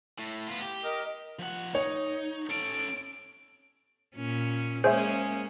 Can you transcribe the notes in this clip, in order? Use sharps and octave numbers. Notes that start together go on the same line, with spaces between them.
A2
B3 F4
G4
A#4 D#5
F3 F#5
D#4 C#5
C#4 A4 D7
A#2 C#4
G#3 A#3 C#4 G#4 C5 C#5 E5